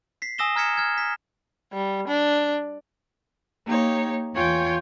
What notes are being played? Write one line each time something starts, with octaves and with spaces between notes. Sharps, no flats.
B6 C7
G#5 D#6 E6 A#6 E7 G7
A#5 F6 G#6 B6 C#7 E7
F6 G#6
B6
G3
D4
A#3 D#4 G4 C#5
E2 F4 C#5 G5 G#5 G6